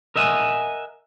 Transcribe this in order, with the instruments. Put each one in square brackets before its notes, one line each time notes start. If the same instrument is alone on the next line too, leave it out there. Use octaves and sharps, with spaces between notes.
[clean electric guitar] A#4 D#5 E5 F#5 G#5